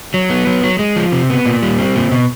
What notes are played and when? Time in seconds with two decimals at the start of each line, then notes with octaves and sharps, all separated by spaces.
0.14 F#3
0.30 B3
0.47 F#3
0.64 F#3
0.79 G#3
0.96 F3
1.12 C3
1.30 B3
1.46 A#2
1.62 G3
1.79 C4
1.95 A#2
2.11 B2